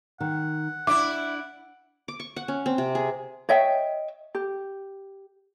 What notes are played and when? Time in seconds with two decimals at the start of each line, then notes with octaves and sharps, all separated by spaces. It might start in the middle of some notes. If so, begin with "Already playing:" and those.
0.20 D#3 F#5
0.87 D4 E4 E5 D6
2.08 D6
2.20 C#6
2.36 F#5
2.48 C#4
2.66 C4
2.78 C3
2.95 G#4
3.49 C#5 D#5 E5 G5
4.35 G4